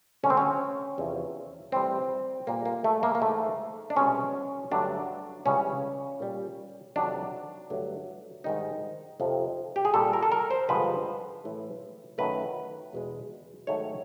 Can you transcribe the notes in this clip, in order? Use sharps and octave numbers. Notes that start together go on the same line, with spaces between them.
D2 D3 G3 C#4
C4
C#4
E2 C3 F3
A2 E3 G3 C4
A#2 G3 A#3
A#3
A3
A#3
A#3
G#2 E3 A3
D4
C2 B2 G#3 C#4
G2 D3 F#3 A3 D4
C#2 C#3 E3 G3 C#4
A#2 G3
F2 C3 D#3 F#3 D4
G2 D3 F#3 A3
G#2 D#3 G3 D#4
F2 C3 F3
G4
G#4
A#2 G3 A4
A#4
A4
A#4
C5
G2 D3 F3 G#3 B4
A2 E3 A3
F#2 D#3 F#3 A3 B4
E2 B2 G#3
G#2 D#3 F#3 A3 C#5